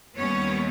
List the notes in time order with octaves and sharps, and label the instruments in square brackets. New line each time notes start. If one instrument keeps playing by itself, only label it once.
[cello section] D#2 D#3 G3 B3 C#4 C#5